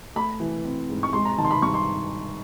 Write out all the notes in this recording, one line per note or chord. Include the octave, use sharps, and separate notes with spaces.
A3 B5
E3
C4
G#2
C#6
G#3 C6
A#5
D#3 A5
C6
B5
G2 C#6
C6